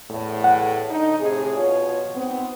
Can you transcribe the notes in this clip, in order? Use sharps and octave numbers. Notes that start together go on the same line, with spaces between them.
E2 A2
F#5
D3 D#4
A2 C3 G#4
B2 F4 C#5
G#2 B3 C4